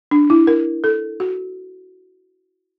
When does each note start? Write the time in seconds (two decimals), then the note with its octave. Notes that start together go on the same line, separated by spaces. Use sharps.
0.11 D4
0.30 E4
0.47 A#4
0.84 A4
1.20 F#4